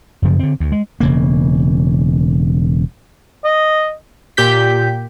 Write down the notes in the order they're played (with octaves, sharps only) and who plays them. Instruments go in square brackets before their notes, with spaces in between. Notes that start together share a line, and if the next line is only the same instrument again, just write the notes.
[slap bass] F#2 C#3 F3
D3 C4
D2
G#3
E1 C#3 A#3
[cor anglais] D#5
[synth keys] A#2 G4 G6 B6